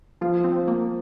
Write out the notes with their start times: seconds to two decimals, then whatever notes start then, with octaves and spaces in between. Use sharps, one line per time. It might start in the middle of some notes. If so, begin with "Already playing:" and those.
0.21 F3 F4
0.44 C4
0.68 A#3